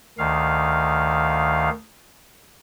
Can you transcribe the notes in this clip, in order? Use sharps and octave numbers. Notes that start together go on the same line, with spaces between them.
D2 D#3 F5